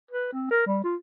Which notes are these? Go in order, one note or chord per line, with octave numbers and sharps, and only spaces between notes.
B4
C4
A#4
G3
F4